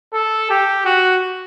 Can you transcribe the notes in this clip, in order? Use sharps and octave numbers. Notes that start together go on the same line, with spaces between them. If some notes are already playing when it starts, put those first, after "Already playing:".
A4
G4
F#4